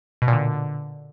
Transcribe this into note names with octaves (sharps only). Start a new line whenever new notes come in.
B2
A#2
D3